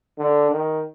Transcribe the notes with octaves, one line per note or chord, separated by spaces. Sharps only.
D3
D#3